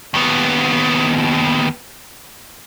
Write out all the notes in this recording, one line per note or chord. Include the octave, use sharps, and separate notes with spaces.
D#2 B3